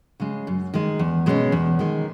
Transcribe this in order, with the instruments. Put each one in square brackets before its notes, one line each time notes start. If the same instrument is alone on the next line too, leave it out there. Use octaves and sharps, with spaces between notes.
[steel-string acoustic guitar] C#3 G#3
F#2
D#3 G#3
E2
B2 G#3 C#4
E2
D#3 G#3